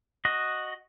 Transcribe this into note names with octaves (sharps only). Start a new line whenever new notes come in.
F#4 D#5